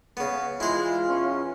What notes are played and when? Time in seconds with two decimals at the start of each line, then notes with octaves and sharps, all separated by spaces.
0.17 C#3 B3
0.60 E3 G#3 E4 F4 C5
1.08 E2 C#4